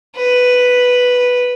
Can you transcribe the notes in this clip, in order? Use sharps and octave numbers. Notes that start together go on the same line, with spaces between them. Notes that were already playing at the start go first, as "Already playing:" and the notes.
B4